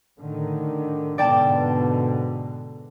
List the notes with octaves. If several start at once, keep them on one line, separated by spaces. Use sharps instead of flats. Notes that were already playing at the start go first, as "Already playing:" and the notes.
A2 D3 D#3
G#2 B2 D3 D5 G5 A5